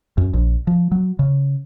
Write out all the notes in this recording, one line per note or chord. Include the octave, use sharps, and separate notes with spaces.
F#2
A#1
F3
F#3
C#3